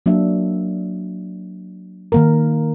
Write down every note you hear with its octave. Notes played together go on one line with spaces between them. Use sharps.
F#3 A#3 D4 E5
D#3 A#3 A#4